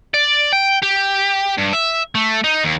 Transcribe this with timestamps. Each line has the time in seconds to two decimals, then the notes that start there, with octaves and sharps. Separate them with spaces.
0.14 D5
0.53 G5
0.83 G4
1.57 G2
1.73 E5
2.15 A3
2.44 D#4
2.64 D#2